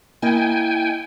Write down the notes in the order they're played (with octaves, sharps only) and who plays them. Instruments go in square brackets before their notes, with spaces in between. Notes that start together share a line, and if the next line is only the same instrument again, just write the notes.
[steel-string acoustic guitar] A#3 E4 D#5 [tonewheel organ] G5 G#5